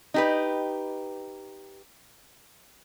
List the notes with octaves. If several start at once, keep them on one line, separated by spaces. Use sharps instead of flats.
D#4 G4 B4